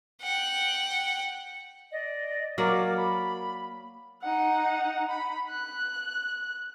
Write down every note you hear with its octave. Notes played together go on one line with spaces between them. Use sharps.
F#5 G5
D5 D#5
F#3 A#3 A#4 D5 D6
B5
D#4 F#5
B5
F#6